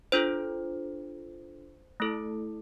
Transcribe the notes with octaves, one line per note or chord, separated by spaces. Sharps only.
D4 F4 A4 C5
A3 E4 A4